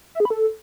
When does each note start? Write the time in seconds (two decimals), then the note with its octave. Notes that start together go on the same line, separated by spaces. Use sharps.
0.15 E5
0.20 G#4
0.25 B5
0.30 A4